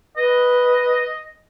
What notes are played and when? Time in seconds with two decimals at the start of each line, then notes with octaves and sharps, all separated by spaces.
0.17 B4 D#5